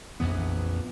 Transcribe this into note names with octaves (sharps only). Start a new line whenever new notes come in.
A#1 F2 E3 B3